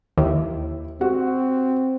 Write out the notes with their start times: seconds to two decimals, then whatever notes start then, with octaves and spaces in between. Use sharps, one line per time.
0.18 D#2 E4
1.01 C4 F#4